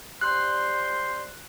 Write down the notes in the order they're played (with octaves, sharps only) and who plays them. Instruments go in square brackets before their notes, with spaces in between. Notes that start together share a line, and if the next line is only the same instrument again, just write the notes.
[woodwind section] G3 C5 C6 [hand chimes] F#6